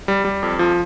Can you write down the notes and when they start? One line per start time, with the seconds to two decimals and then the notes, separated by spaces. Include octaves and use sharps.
0.08 G3
0.25 G3
0.43 F2
0.59 F3